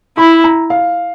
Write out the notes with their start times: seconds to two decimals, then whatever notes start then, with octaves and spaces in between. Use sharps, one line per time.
0.17 E4 B5
0.44 A#5
0.70 F5